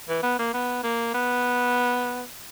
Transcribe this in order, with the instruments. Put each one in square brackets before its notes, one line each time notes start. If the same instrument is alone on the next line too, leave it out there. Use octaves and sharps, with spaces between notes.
[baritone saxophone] E3
B3
A#3
B3
A#3
B3